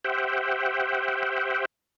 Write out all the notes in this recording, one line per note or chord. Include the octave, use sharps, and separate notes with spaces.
G4 C5 E5 F#5 G5